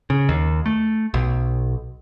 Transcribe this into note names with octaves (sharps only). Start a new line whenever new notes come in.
C#3
D#2
A3
B1